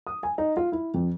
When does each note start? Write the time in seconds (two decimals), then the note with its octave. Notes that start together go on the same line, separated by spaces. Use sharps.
0.07 D#6
0.23 G#5
0.38 D#4
0.57 F4
0.72 E4
0.94 F2